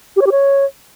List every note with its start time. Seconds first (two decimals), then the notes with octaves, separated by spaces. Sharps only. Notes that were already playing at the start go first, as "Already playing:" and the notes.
0.16 G4
0.21 C#5
0.26 G4
0.31 C#5